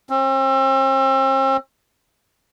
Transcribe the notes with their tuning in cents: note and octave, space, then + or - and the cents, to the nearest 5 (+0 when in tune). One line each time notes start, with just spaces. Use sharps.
C4 +40